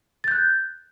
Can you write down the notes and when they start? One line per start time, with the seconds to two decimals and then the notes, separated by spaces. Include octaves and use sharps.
0.24 A6
0.28 G6
0.31 F#6